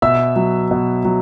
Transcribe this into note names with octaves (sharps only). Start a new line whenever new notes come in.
B2 E5 E6
F#3
B2
F#3